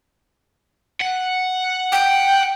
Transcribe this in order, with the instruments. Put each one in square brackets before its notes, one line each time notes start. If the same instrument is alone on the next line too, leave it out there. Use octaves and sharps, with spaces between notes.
[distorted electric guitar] F#5
[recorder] G5